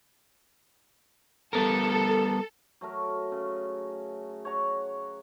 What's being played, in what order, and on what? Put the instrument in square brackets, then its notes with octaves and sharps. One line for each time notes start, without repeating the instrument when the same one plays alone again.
[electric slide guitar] G3 B3 A#4 [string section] A4
[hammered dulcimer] F#3 A3 A#4
C#3
C#5 F#5 A#5